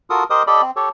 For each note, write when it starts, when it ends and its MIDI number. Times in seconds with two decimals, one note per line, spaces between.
0.10 0.24 65
0.10 0.24 66
0.10 0.24 69
0.10 0.24 70
0.10 0.24 87
0.30 0.43 67
0.30 0.43 70
0.30 0.43 72
0.30 0.43 75
0.30 0.43 87
0.47 0.62 67
0.47 0.62 69
0.47 0.62 74
0.47 0.62 75
0.47 0.62 83
0.62 0.71 60
0.76 0.89 67
0.76 0.89 69
0.76 0.89 73